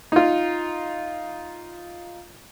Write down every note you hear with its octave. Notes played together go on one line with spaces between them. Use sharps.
D#4 F4